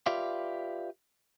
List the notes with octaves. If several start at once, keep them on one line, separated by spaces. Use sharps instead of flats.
F4 G4 B4 D5 E5 F5